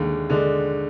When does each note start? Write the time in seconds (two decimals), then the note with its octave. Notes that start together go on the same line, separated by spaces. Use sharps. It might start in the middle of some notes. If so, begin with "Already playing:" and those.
Already playing: D#2 D3 G#3 D4
0.30 D3 G#3 D4